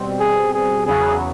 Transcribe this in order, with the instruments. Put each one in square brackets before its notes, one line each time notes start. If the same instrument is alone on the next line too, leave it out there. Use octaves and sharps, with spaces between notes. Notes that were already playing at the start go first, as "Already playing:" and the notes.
Already playing: [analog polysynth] B2 G3 C4
[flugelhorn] G#4
G#4
[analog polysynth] E2 C#3 F#3 B3 [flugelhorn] G#4